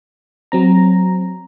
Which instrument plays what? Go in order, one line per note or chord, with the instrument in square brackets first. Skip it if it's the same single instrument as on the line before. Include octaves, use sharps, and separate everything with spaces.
[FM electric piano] F#3 C4 A#5